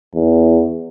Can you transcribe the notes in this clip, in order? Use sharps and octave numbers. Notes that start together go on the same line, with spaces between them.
E2